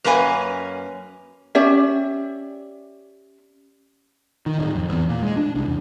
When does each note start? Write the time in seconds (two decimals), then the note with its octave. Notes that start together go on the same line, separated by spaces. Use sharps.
0.04 F#2 A#3 C#4 B4 G#5
1.55 C#4 G4 D5 E5
4.46 D#3
4.59 D1
4.75 F2
4.89 E2
5.09 A#2
5.23 G#3
5.37 D4
5.55 C2
5.67 E2